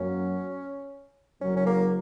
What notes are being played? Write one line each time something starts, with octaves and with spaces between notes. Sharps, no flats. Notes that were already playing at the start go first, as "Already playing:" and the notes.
Already playing: F#2 F#3 A#3 C#4
F#1 F#2 F#3 C#4
C#4
A#3